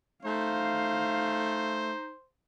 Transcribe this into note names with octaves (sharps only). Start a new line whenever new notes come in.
A3 D#4 C5 F5